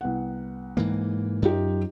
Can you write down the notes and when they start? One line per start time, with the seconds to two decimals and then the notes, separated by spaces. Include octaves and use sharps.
0.01 C2 B3 F#5
0.77 G#2 E3 A#3
1.42 F#2 D#4 F4 G4